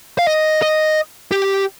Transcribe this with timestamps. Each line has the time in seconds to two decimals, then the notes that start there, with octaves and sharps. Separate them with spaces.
0.19 F5
0.28 D#5
0.62 D#5
1.32 G4